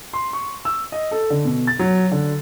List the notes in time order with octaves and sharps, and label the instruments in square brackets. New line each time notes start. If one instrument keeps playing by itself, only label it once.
[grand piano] C6
C#6
E6
D#5
A4
D3
B2
A6
F#3
D3